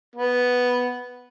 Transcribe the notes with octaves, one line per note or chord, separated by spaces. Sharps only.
B3